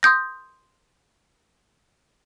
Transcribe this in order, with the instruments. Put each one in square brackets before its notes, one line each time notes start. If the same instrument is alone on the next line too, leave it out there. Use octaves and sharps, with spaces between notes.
[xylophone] C6 D#6 G6 A#6